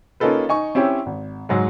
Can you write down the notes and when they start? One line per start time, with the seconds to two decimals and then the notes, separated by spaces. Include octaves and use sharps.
0.20 A#3 C#4 D#4 F4 A4 B4
0.49 D#4 G#5 C#6
0.75 C4 C#4 E4 G4 C#5
1.06 G#1
1.49 G#2 F#3 G#3